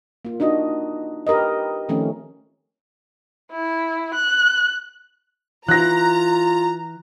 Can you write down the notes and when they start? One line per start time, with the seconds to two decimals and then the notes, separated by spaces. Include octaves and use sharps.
0.25 A#3 F4
0.40 D4 D#4 F#4 D#5
1.27 G4 A#4 B4 D#5
1.89 D#3 F3 A3 C4 C#4
3.51 E4
4.14 F#6
5.68 E3 F4 A#5 F#6 A#6